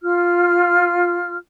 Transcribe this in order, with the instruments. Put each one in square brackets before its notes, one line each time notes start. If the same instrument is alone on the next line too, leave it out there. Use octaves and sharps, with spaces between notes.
[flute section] F4 F6